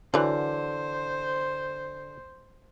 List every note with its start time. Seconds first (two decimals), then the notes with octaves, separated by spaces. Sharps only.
0.14 D3 E3 F#3 C5